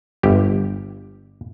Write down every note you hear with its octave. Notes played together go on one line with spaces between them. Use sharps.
G1 G4